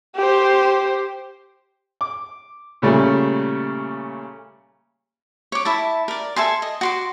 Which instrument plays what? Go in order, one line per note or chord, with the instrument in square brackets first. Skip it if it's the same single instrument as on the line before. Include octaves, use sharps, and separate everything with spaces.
[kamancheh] G4 C5
[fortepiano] D6
A#2 C#3 G3 A3
[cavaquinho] C#5 D6
E4 E5 A5
A#4 D5
A4 E5 G#5 C6
D#5
F#4 C6 D6